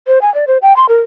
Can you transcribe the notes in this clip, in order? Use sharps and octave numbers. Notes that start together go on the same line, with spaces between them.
C5
G#5
D5
C5
G5
C6
A#4